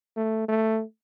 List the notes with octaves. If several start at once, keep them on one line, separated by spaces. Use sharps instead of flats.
A3
A3